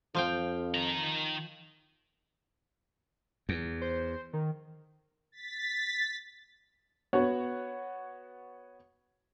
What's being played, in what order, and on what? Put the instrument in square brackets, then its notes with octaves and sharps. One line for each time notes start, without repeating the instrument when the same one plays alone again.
[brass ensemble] F2 [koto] F3 F5 G5
[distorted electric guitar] D#3 A#5
[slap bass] E2
[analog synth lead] C5
D#3
[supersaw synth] A6 B6
[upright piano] B3 F#4 C#5 F#5